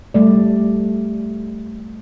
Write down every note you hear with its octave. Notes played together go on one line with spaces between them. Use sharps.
G3 A3 D5